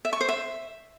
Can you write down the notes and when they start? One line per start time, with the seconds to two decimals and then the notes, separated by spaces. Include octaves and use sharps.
0.05 E5
0.13 C#6
0.21 C5
0.29 E5